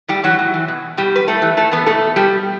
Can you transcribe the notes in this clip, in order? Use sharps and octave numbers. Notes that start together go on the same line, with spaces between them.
A2 G3 G4
E3 F#3 F#4
A2
E3
B2
B2 G3 G4
B4
A2 A3 A4
E3
A2 A3 A4
E3 B3 B4
B2 A3 A4
B2 G3 G4